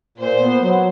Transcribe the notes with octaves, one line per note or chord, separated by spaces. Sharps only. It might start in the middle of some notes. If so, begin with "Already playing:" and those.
A#2 C5
B3
F#3